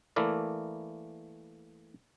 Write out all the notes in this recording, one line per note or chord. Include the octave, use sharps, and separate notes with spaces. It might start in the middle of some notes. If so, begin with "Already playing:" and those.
E3 A3 A#3 E4 A#4 D5